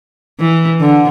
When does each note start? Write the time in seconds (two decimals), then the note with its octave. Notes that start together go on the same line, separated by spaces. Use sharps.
0.40 E3
0.80 D3